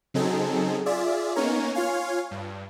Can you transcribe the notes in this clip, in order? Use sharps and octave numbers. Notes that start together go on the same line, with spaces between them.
C#3 F#3 C4 D#4 G#4 A4
F4 G#4 D5 E5
A#3 B3 C#4 D#4 A#4 C#5
F4 C#5 F5 G#5
G2